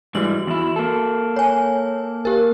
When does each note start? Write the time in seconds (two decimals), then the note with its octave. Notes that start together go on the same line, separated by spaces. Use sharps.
0.15 G#2 E3 G3 F#4 F#7
0.47 E2 E4
0.76 A#3 A4
1.36 C#5 G#5
2.25 G4 A#4